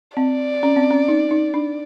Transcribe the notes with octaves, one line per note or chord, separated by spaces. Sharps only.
C4 D5
C#4
C4
C#4
D#4
D#4
D4